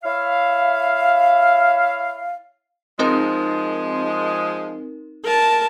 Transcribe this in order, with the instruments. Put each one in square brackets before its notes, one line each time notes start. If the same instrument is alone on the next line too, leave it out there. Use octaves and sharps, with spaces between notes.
[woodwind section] E4 C#5 E5 F5
[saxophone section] F3 G#3 [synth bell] C4 D#4 A#4
[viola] A#4 A5